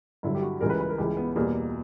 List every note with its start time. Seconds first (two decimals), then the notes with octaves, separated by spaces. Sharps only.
0.23 G2 D3 F#3 E4
0.35 G4
0.42 F#4
0.60 C#2 C#3 E3 G3 A#4
0.70 B4
0.80 B4
0.90 A#4
0.98 C#2 C#3 E3 G3 G4
1.17 B3
1.36 E2 B2 G3 A#3